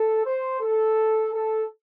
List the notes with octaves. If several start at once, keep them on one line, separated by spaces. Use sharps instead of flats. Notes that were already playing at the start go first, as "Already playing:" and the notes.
Already playing: A4
C5
A4
A4